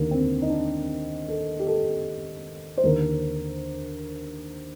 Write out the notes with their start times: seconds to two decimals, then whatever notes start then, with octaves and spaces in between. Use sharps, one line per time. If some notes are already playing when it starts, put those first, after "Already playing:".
Already playing: D#2 D3 A#3
0.11 C4
0.42 D#4
0.50 D4
1.28 A4
1.60 G4
1.67 A4
2.78 C5
2.83 D#2 D3 A#4